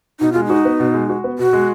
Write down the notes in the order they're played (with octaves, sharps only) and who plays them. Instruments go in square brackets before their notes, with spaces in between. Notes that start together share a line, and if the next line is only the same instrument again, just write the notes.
[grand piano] B2 [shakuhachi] D#4
[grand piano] G#3 [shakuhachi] F4
[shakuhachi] D#4 [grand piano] F#4
[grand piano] B3
B2
G#3
F#4
B3
[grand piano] B2 [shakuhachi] F#4
[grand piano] G#3